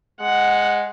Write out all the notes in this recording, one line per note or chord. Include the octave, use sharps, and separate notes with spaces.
G#3 F#5